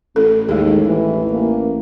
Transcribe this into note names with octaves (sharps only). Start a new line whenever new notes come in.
A1 A4
D#2 G#3 G#4
E3
A#3